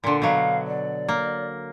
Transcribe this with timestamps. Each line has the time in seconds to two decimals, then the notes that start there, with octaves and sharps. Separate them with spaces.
0.04 A#2 D3 C6
0.22 B2 F#3 F5
0.66 D5
1.09 A#3